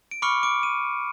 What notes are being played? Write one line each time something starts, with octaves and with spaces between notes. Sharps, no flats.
D7
B5 C#6 D6 F6 C#7
D6 D7
D#7